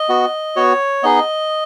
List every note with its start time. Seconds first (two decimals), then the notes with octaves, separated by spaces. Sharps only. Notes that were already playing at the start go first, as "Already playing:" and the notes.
Already playing: D#5
0.09 B3 F#4
0.56 B3 F#4 C#5
1.03 B3 D#4 G#4 D#5